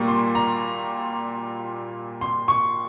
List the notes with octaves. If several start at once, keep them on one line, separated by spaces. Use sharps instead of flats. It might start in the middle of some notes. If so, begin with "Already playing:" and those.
Already playing: A#2 G3 A#3 F4 C#6
C6
A#5
C6
C#6